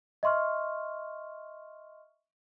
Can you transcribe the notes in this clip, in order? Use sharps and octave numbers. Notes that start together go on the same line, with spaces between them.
D#5 E5 C6 C#6 F6